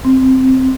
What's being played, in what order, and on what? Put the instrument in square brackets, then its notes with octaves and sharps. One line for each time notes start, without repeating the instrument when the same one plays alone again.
[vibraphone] C4